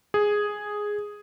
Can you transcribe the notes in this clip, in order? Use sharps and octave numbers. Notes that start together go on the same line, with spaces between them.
G#4